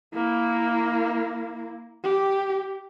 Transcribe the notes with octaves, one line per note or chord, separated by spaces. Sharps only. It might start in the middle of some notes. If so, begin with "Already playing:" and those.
A#3 E4
G4